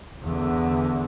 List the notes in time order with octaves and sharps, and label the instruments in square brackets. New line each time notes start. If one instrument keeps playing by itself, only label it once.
[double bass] E2 D3